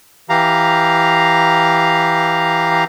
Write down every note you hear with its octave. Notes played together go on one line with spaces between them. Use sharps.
E3 G4 F5 A#5